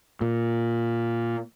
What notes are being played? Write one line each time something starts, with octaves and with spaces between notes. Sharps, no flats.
A#2